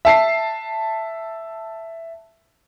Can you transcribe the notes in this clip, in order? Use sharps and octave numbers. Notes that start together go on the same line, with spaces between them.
E5 A5 C7